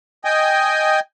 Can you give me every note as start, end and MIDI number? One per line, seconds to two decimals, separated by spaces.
0.25 1.00 75
0.25 1.00 79
0.25 1.00 80